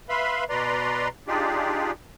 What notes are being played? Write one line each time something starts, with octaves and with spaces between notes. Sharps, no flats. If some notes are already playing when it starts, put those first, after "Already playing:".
B4 E5 F5 B5 C6
B2 B4 D5 A#5 C6
D4 D#4 F4 G4 G#4 D5